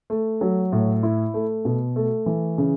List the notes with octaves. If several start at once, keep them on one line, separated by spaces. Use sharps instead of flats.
A3
F#3
A2
E4
A3
B2
A3
E3
C#3